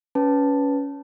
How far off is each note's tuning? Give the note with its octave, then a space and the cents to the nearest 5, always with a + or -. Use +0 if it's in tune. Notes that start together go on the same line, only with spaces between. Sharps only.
C#4 +20 B4 +0 A5 +0